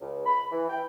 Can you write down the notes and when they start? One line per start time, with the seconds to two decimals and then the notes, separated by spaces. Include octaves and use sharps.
0.01 C#2
0.26 B5
0.52 E3
0.70 G5